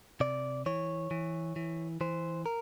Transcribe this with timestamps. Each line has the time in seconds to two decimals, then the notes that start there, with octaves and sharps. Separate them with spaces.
0.20 C3 D5
0.66 E3 C#5
1.11 E3
1.56 E3
2.01 E3 C5
2.46 A#4